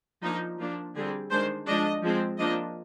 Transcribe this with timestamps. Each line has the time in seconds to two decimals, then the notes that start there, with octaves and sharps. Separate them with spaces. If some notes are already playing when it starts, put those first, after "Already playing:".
0.23 F3 A#3 D4 D#4
0.59 F3 A#3 D4 F4
0.95 D3 G3 C4 G#4
1.31 D#3 G#3 D4 C5
1.67 F3 G#3 D4 D#5
2.03 F3 G#3 C4
2.38 F3 A#3 D4 D#5